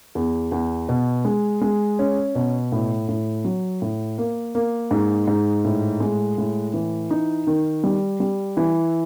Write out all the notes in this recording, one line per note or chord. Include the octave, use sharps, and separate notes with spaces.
E2
E2
B2
G#3
G#3
C#4
B2
A2
A2
F#3
A2
A#3
A#3
G#2
G#2
A2
G#3
A2
E3
D#4
D#3
G3
G3
E3